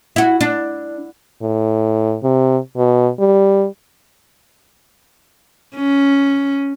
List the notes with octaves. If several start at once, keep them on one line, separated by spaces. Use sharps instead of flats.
E4 F#4
D4
A2
C3
B2
G3
C#4